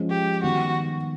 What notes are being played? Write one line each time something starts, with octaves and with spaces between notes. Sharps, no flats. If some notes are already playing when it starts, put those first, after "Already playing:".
Already playing: F3 G#3 C#4
G4
D#3 G3 B3 F#4